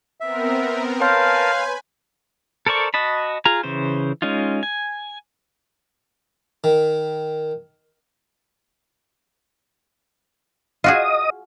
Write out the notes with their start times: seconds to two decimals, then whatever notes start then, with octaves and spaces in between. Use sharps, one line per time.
0.20 B3 C4 A#4 E5
1.01 A#4 B4 C#5 F5 G#5 A5 C6 G6
2.66 A4 A#4 C5 D5 C#6
2.94 F#4 D#5 A5 B5
3.45 F4 G#4 A#5
3.63 C#3 E3 C5
4.22 G#3 C#4 D#4 F4
4.63 G#5
6.64 D#3
10.84 F4 F#4 G#4 D#5 D#6